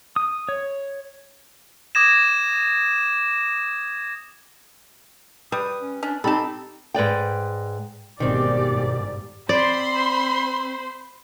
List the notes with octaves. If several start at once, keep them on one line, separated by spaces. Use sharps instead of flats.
D#6
C#5
D6 D#6 G#6 A#6 E7
G3 B4 D#6
C#4
C#4 D4
C4 D#4 G4 A4 A5 B5
G#2 B4 D5 G5
G1 G#2 B2 D#3 C4 G4 D5
C4 C5 D5 B5 C6